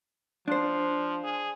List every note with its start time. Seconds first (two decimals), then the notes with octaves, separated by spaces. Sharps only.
0.48 F3 D4 C5
1.24 G#4